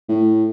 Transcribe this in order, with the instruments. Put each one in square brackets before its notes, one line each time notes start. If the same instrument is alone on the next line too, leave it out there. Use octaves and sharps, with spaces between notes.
[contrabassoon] A2